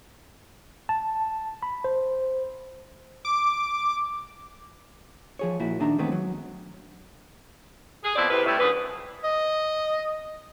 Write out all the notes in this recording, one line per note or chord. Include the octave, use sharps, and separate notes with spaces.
A5
B5
C5
D6
F3 G#4 C#5
A#2 F3 E4 F#4 E5
A#2 D#3 D4 E5 A#5
D#3 E3 G#3 A3 B3 C4
F#3
G#4
F2 B2 F3 E4 C5 D5
A2 C3 B4
G3 A3 C#4 E4
F#2 D3 E3 G#4 B4
D#5